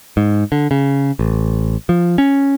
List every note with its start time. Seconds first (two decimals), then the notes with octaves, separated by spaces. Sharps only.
0.17 G#2
0.52 D3
0.71 C#3
1.19 A1
1.89 F3
2.18 C#4